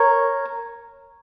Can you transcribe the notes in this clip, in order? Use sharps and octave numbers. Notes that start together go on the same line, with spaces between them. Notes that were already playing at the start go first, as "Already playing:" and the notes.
Already playing: A#4 C#5